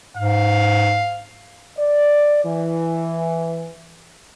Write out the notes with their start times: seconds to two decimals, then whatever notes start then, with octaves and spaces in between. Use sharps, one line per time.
0.17 G#2 F5
1.78 D5
2.45 E3